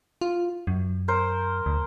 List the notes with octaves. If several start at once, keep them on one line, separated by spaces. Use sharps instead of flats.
F4
F#2
A#4 C5
D2